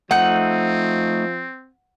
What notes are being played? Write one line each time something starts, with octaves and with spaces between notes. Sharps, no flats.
F3 A3 C4 D#4 F#5 G6